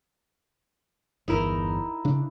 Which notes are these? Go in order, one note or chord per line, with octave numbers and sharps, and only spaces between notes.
G1 E2 D#4 E4 A#4
C#3 D4